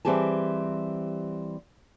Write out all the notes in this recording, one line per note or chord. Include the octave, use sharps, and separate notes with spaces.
E3 G3 C4 G4 G#4 A5